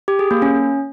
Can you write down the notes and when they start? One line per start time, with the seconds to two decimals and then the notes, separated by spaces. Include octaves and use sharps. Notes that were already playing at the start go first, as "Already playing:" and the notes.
0.08 G4
0.19 G#4
0.31 A#3
0.42 C#4